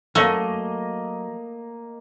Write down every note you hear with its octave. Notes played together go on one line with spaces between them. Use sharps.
F#3 A3 A#3 A#4 C#5 D#5